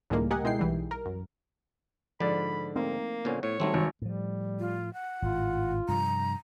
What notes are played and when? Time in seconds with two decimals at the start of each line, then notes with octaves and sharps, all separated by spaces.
0.10 C#2 A2 D#3 G3 G#3 A#3
0.31 G4 A#4 D#5 F#5 G#5
0.44 B2 G#3 D#4 E4 G5 C7
0.59 B1 E3 G3
0.91 A#4
1.06 F#2
2.20 G#2 D3 F3 D5 B5
2.76 A3 A#3 C4 D#4
3.25 A#2 D3 B3 C#4 C5
3.43 A2 C#5
3.60 D#3 F#3 G3 A3 C4 D#4
3.74 G#1 C4
4.02 A2 F3 G3
4.60 F4
4.93 F#5
5.22 G#1 A2 F4
5.88 G2 C3 F3 A#5